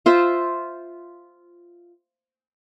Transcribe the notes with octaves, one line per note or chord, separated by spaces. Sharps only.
F4 C5 E5